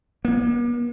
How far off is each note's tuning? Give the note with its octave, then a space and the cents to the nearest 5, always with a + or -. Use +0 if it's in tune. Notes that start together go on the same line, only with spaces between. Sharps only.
A#3 +45